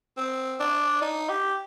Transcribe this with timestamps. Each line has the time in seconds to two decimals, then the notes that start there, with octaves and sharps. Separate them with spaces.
0.17 C4
0.60 D4
1.01 D#4
1.29 G4